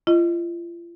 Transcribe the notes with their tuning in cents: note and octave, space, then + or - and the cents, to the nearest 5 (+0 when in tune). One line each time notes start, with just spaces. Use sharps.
F4 -35 D#5 +0